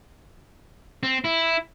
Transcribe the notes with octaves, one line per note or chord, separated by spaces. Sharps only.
C4
E4